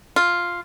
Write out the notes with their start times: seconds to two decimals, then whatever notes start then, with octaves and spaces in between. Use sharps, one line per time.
0.16 F4